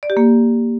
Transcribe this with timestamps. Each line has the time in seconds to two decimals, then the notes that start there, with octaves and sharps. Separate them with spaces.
0.03 D5
0.10 G4
0.17 A#3